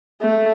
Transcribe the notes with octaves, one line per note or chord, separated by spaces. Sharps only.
A3